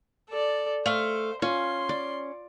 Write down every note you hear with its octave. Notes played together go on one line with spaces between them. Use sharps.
A4 D5
A3 C5 F5
C#4 F4 C6
D5